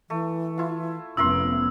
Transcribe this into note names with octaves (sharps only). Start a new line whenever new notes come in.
E3 A3
E4 F4
F1 B3 C#4 E4 A#4 C6 E6